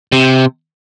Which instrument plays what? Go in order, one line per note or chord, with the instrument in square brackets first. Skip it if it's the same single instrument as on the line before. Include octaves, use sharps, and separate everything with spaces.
[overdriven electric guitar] C3